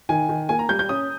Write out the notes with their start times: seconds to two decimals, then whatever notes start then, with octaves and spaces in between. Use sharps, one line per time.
0.09 D#3 G#5
0.29 D#3
0.49 A#3 G#5
0.59 A#5
0.69 G3 G6
0.79 G6
0.89 C#4 D#6